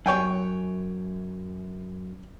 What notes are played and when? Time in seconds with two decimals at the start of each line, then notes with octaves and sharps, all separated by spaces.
0.06 F#2 C#5 G5 G#5